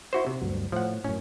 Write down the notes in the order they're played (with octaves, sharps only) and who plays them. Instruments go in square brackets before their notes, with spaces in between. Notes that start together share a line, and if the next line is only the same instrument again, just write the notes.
[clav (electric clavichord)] E4 F#4 C5
C3
[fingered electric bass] D2 G2 F#3
[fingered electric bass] A2 [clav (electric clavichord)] F3 F#5
[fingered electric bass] F#2 A2 [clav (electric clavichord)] C#4